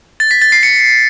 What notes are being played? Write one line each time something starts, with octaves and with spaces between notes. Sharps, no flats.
A6
B6
A6
C7
C#7